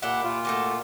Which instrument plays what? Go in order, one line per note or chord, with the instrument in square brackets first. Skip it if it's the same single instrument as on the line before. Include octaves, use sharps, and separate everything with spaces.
[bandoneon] A#2 F#5 [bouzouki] E4 G4
[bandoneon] A#2 F4
[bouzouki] A3 F#4 G4